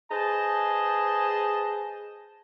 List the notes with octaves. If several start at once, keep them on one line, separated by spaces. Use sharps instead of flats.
G#4 B4 C5 D#5 A5